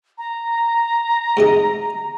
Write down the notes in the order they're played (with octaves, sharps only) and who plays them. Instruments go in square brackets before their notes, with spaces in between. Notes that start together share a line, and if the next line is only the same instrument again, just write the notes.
[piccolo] A#5
[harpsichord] G#2 C3 D#4